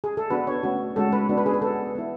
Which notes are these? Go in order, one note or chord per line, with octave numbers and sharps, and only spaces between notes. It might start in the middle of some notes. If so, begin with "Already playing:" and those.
G#4
A4
B3 D4 F#4 B4
C#5
A3 C#4 F#4
G#3 C#4 F#4 A4
B4
B3 D4 F#4
B4
G#4
B4
B3 F#4 A4
B3 E4